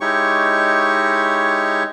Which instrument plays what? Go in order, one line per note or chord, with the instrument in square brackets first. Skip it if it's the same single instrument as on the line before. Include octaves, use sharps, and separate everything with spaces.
[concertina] G#3 D#4 E4 G4 C#5 C#6